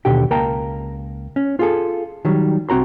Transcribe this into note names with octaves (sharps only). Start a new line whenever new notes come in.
D#2 B2 D3 G4 G5
C#2 A#3 G5 A5 A#5
C#4
F4 G#4 A4
D#3 F#3 G3
C2 C4 F#4 A#5 C6